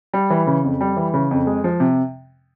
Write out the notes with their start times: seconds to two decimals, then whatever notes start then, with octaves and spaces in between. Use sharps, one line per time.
0.14 G3
0.30 E3
0.47 C#3
0.64 F2
0.81 G3
0.97 E3
1.14 C#3
1.31 F2
1.47 G#3
1.64 F3
1.80 C3